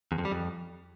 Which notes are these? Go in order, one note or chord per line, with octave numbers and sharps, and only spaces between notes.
E2
F2
G3
F2